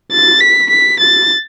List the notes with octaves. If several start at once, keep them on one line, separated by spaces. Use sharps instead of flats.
A6
B6
B6
A6